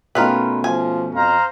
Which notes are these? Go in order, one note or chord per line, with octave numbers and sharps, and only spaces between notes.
B2 D#3 A3 C#4 F4 B4
F3 G#5
F2 C5 F5 A#5